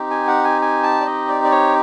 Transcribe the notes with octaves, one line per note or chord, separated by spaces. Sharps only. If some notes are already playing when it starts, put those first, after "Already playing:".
Already playing: C4 D#4 G4
G#5
F#5
G#5
G#5
A5
D5
D#5
D5
D5
C#5